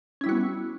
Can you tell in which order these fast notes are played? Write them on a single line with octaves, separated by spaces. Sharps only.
C#4 E4 G3 F#4 B3